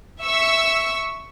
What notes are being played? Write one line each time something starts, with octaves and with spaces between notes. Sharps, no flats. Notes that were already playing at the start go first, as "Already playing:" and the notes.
E5 C#6 E6